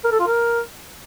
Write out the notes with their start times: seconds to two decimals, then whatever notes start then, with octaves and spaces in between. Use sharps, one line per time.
0.04 A#4
0.12 A4
0.19 F4
0.27 A#4